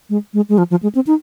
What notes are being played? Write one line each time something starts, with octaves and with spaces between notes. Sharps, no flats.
G#3
G#3
G#3
F3
F3
G#3
C4
D#4